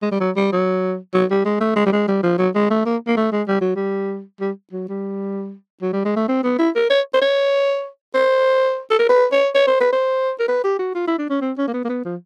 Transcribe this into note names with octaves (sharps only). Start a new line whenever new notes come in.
G#3
G3
F#3
G3
F#3
F#3
G3
G#3
A3
G#3
G3
G#3
G3
F3
F#3
G#3
A3
A#3
A#3
A3
G#3
G3
F#3
G3
G3
F#3
G3
F#3
G3
G#3
A3
C4
B3
E4
A#4
C#5
C5
C#5
C5
A4
A#4
B4
C#5
C#5
C5
B4
C5
A#4
B4
G4
F#4
F4
E4
D4
C#4
C4
C#4
A#3
B3
A#3
B3
F3